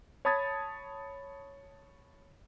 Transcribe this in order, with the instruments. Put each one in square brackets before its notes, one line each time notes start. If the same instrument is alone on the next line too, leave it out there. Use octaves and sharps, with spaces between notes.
[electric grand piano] C#5 A5 B5 D#6 G#6 A6